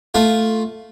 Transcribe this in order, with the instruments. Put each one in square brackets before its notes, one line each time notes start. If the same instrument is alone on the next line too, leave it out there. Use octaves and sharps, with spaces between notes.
[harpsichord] A3 F4